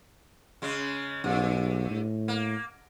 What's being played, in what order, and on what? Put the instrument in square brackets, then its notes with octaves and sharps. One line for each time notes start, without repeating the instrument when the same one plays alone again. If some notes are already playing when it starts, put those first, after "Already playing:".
[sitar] C#3 G#3
[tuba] B1 [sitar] G2
[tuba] A2
[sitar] A#3